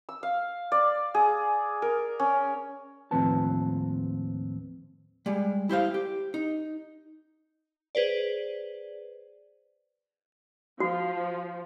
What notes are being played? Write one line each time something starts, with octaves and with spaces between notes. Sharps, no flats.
E6
F5
D5
G#4
A#4
C#4
D#2 A2 F3 C4 B4 A5
G3 G#3
E4 G4 C5 F5
G4
D#4
G#4 B4 C5 D5
F3 F#4